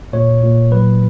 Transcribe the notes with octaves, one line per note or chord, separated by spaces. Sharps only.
A#2 C#5
A#2
F#3 B4